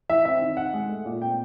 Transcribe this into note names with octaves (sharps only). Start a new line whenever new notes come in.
E3 E5
C4 E5
D#3
D#4 F#5
G#3
A3
A#2
C4 G5